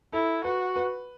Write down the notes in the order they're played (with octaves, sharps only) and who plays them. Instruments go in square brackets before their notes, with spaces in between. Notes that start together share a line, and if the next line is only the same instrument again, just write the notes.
[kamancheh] E4 [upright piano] A4
[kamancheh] F#4 [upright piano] B4
[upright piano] B4